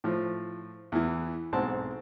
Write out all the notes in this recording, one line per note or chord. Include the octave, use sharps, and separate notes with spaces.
A2 F3
E2 E3
B1 G#2 C4 F#4 A5